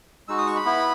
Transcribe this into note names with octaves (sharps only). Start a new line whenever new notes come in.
G#3 D#4 F#4 E6
D#6
C#6
B5
B3 E4